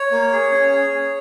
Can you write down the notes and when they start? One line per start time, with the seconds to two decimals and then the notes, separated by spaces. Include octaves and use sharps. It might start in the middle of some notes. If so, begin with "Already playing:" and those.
Already playing: C#5
0.11 A#3
0.32 G#4
0.52 C#4
0.73 G#4
0.92 G#4